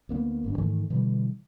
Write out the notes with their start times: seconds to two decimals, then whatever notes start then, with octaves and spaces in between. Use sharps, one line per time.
0.09 D2 A#3 B3
0.44 G1 G#2 D4
0.58 G#2 D#3 E3 A3
0.90 B2 D3 E3 G3